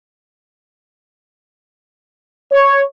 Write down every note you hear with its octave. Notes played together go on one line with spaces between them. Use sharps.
C#5